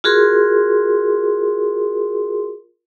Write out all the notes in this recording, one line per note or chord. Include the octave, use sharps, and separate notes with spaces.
F4 F#4 G#4 A#4 C6